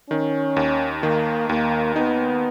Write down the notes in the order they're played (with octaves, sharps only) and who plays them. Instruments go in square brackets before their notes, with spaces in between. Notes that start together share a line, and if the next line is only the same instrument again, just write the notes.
[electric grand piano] D#3 [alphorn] C#4
[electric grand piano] D#2
[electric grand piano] D#3 [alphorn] A#3
[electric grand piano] D#2 [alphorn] A#3
[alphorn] B3 [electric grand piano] D#4